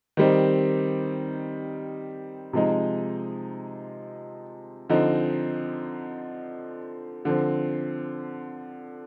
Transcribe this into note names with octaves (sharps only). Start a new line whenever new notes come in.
D#3 G3 C4 D#4
C3 F3 G#3 D#4
D3 F3 C4 D#4
D3 F3 C4